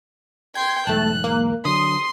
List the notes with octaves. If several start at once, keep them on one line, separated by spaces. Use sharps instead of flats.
G5 C6 G#6
B1 E2 G#2 A3 A5 F#6
A#3
D3 F#3 C6 D#6